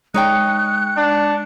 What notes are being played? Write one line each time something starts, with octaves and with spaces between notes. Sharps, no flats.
G#3 D#4 C#5 G5 F#6 C#7
D4